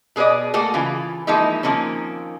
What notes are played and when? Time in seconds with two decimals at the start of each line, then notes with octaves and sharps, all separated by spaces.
0.16 B2 G#4 B4 D5 D#5
0.54 A3 A#3 F#4 G#4 A4
0.74 C#3 E3 F4
1.27 E3 F3 G#3 A#3 D#4 E4
1.63 D#3 F3 A#3 C4 C#4